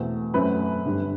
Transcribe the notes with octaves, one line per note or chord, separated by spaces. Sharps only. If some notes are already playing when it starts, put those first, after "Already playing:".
Already playing: E2 B2 A3 C4
F#2 F#3 A3 C4 B4
G1 G2 D3 G3